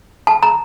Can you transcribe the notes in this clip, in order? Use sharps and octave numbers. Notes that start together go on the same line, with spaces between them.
A5
A#5